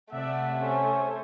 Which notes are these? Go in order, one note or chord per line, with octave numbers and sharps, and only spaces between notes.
C3 A3 D5 E5 F#5
C#4 A4 C5 G#5